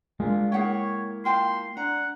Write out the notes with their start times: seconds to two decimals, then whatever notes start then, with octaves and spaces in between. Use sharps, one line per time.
0.20 G#3 A#3 D4 F4
0.52 A#3 E4 G#4 C#5 F#5 G5
1.25 F4 G5 A5 C6
1.77 D4 F#5 A#5